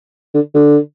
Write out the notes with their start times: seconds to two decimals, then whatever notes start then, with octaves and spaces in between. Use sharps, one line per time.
0.34 D3
0.54 D3